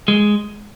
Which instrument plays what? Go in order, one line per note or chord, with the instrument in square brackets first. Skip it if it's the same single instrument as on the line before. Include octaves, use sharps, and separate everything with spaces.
[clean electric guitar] G#3